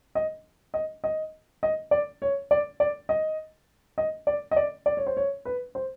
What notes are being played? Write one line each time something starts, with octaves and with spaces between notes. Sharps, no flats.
D#5
D#5
D#5
D#5
D5
C#5
D5
D5
D#5
D#5
D5
D#5
D5
D5
C#5
C5
C#5
B4
C5